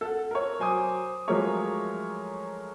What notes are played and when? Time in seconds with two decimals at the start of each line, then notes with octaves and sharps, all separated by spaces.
0.01 A4 F#5
0.31 A#4 C#5
0.59 F#3 C5 G#5 D6 D#6
1.28 F3 F#3 G#3 A3 A#4 C#5